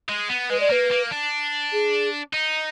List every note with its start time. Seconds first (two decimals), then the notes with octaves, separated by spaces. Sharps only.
0.09 G#3
0.29 B3
0.50 G#3 B4
0.60 D5
0.70 A#3 B4
0.91 A#3
1.11 D4
1.73 G#4
2.33 D#4